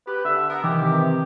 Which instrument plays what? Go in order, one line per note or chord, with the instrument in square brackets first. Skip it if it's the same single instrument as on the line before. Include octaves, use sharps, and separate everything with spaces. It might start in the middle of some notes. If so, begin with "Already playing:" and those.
[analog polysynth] G4 [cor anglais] B4
[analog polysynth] D3 [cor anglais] E5
[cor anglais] B3 [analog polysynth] A#4
[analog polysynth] C3 D#3 E3 [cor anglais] G4